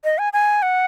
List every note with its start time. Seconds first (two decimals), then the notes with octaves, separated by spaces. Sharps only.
0.04 D#5
0.18 G#5
0.33 G#5
0.62 F#5